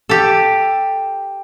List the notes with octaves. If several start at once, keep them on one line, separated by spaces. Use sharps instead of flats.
G4 A4